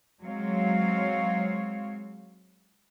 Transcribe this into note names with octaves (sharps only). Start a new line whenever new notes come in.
F#3 G#3 C4 C#5 F5